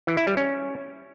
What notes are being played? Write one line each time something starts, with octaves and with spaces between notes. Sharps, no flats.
E3
E4
G3
C#4